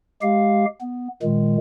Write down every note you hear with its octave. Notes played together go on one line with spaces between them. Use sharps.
G#3 G4 F5
B3
A#2 D#3 G#3